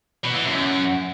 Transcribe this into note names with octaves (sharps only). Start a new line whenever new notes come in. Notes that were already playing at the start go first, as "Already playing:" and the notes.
B2
E3
F#2